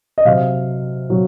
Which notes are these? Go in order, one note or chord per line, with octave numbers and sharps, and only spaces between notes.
D#5
C3 F#3 F5
C3 F#3